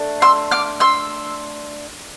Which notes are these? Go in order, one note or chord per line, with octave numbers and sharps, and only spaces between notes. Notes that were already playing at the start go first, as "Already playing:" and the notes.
Already playing: A3 D4
C6 E6
D6 F6
C6 E6